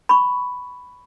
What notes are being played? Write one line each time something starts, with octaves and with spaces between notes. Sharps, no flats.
B5 C#6